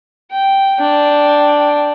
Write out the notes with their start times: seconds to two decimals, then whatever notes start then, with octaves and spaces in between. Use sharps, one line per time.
0.32 G5
0.80 D4 G5